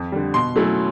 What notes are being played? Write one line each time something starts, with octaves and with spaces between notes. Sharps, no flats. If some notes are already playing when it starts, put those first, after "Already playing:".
Already playing: F2
D3 G3
B2 C6
F#3 A3 C#4 E4